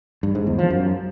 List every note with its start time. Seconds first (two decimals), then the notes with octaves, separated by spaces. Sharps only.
0.23 G2
0.35 G#2
0.47 E2
0.59 F3
0.70 F#2